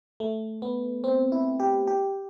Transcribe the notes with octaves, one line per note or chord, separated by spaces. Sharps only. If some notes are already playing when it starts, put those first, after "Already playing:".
A3
B3
C4
E4
G4
G4